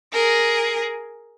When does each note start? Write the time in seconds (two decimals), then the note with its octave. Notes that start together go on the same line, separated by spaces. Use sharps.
0.12 G#4 A#4